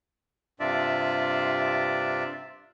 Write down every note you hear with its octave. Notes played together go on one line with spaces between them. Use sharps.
G2 C3 D4 F4 D5 E5